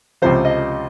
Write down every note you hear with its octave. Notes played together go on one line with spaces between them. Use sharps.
C#2 C3 F3 C5
D#5